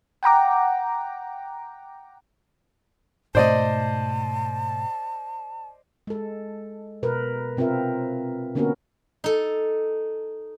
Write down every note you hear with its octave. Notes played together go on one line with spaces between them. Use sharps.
F#5 G5 A#5 D6
G#2 B2 A3 C5 D5 D#5 A5
G#3 A4
B2 A#4 B4
C3 C4 F4 A#4 E5
D3 A#3 B3 C#4 F#4 A#4
D#4 A4